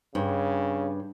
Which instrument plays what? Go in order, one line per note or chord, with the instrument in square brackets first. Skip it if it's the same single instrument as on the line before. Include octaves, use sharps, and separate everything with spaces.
[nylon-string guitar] G2 [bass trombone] C#3